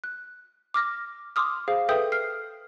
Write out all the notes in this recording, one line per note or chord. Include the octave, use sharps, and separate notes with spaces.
F#6
D6 F6 A#6
C6 D6 D#6 F6
G#4 C5 F5
A4 B4 E5 G5 D#6 G6
F6 C7